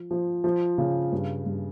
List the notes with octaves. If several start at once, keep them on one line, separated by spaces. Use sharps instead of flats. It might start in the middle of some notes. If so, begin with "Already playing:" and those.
Already playing: F3
F3
F3
C#3
G2
G2